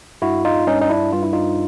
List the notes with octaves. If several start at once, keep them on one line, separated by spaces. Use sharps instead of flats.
G2 E4 F#4
D#4 F4
G2 C#4 D#4
D#4
D4 E4
G2 F4
E4
D#4 F4